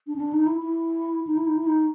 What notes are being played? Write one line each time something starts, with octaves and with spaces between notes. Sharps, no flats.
D4
C#4
D4
D#4
E4
E4
D#4
E4
D#4
E4
D#4